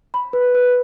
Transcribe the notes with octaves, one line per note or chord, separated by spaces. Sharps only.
B5
B4
B4